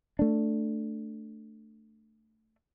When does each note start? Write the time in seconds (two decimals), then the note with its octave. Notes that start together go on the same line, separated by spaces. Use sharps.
0.19 A3 D4